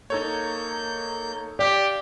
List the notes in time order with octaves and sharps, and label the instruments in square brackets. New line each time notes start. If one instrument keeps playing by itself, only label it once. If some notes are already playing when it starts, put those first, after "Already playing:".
[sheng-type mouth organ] A#3 G6 [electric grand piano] D#4 A4 C#5
[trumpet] G4 [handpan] D5 [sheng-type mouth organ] F5